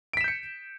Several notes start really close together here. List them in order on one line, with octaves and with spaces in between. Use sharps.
D7 B6 E7 G6 C#7